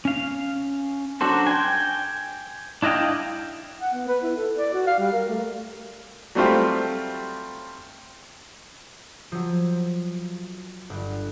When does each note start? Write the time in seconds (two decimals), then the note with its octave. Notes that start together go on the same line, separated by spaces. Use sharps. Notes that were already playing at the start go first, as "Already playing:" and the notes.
0.05 C#4 F5
1.21 F#3 D4 F#4 A4 C5
1.47 G5 G#5
2.82 D4 E4 D#5 F5 G5
3.81 F#5
3.94 B3
4.08 B4
4.23 E4
4.36 A4
4.57 D5
4.73 F#4
4.87 F5
4.99 G3
5.12 A#4
5.28 A3
6.35 F#3 G3 A3 C4 F4 G4
9.32 F3 F#3
10.90 G1 F#5